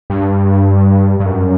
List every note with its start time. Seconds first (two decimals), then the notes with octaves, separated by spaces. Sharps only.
0.10 G2
1.20 G2
1.26 F#2